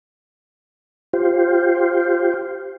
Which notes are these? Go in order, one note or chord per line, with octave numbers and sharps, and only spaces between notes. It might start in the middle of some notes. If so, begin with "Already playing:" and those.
F4 G4 C5